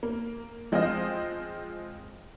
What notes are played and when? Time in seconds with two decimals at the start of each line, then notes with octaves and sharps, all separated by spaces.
0.03 A#3
0.72 F3 G#3 C4 F4 C5 D#5